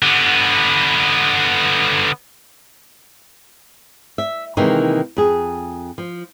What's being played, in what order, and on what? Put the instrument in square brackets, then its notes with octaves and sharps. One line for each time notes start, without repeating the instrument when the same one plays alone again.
[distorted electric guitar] D3 B3
[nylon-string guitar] E5
C3 D#3 E3 G#3 A#3 D#4
F2 G#4
F3